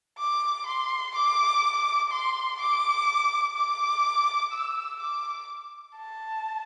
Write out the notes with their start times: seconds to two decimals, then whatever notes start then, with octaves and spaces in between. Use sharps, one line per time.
0.18 D6
0.66 C6
1.15 D6
2.12 C6
2.60 D6
3.56 D6
4.52 E6
5.00 D6
5.97 A5